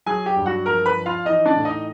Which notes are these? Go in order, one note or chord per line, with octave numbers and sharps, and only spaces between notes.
F#3 G#4 G#5
G4 G5
G2
F#4 F#5
F3 A#4 A#5
B4 B5
F3
F4 F5
E3 D#4 D#5
D4 D5
A2
D#4 D#5